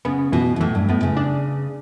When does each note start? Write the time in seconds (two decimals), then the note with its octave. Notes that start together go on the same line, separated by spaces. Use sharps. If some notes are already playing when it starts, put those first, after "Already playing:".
0.05 C#3 B3
0.32 B2 E3
0.56 B2
0.60 A2 E3
0.75 G2
0.89 A2 B3
1.03 C#3
1.17 D4